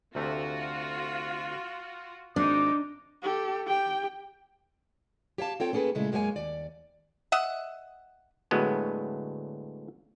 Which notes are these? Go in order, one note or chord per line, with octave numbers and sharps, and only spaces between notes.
D2 C3 A3 F4 F#4
G#1 D4 D#4 D6
G4 A4
G4 G5
G4 C#5 F5 A5
C4 F4 A4 C#5 G5
A#3 C#4 G#4 A4 B4
A#2 C#3 G#3 A3 E4
F#2 G#3 A#3 G4 C#5 G#5
D#2 D5
D#5 E5 F#5
D2 A2 F#3 G#3 B3